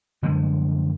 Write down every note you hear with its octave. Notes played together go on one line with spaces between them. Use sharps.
F#2 D3 F3 G#3